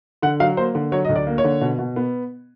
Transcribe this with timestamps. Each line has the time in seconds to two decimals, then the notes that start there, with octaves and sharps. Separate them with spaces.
0.22 D3 F#5
0.40 F#3 F5
0.57 A#3 C5
0.75 D3
0.92 F#3 C#5
1.05 D2 D#5
1.16 D5
1.27 A#3
1.38 C#5
1.44 D3
1.61 B2
1.79 B2
1.96 B3